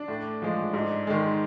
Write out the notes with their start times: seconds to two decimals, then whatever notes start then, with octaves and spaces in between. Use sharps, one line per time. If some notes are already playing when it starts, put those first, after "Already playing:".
Already playing: D4
0.08 A2
0.42 F3 G#3
0.73 G#2
1.07 D#3 G#3